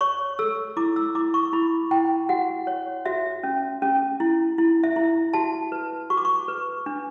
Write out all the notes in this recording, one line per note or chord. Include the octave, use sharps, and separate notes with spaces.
C#5 C#6
A4 E6
E4 D6
E6
E4 D6
C#6
E4 B5
E4 G5
F#4 F#5
C#5
F#4 E5
C#4
C#4
E4
E4
E5
E4
F#4 A5
B4
F#4 C#6
D6
C#6
B4
D4